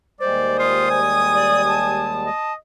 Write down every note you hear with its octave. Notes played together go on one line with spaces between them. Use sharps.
D#2 G3 G#3 C5 D5
F4 D#6
G#5
D5
A5
D#5